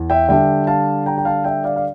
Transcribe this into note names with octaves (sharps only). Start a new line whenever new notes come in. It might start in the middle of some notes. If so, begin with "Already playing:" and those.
Already playing: E2 E3
E5 G5
D3 G3 D4 E5 G5
F5 A5
G5 A#5
G5
F5 A5
E5 G5
D5 F5
F5